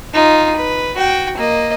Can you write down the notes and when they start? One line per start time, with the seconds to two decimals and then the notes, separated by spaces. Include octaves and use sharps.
0.14 D#4 F4
0.56 B4
0.95 F#4 G5
1.37 A#3 D#5